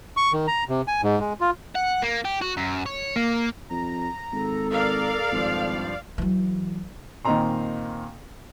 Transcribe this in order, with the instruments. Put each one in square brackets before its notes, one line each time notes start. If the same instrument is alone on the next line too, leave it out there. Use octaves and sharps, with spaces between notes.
[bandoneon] C#6
D#3
A#5
C3
G#5
G#2
G#3
F4
[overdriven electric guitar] F#5
A#3
G4
F#4
F#2
C#5
A#3
[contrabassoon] F2 [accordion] A#5
[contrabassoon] G#1 [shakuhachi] A4
[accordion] A#4 [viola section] D5 F5
[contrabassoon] G#1 [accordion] G2 F3
[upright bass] E3 F#3
[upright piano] A#2 D#3 C4 D#5 A#5 C6